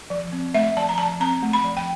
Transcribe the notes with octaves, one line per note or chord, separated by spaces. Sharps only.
F3
C4
A3 E5
F3 A5
A#5
F3 A5
C4 A#5
A3
B5
F3
G5